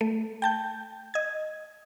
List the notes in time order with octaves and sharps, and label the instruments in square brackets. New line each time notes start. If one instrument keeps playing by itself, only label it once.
[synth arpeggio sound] A3
G5 A5 G6
D#5 G#6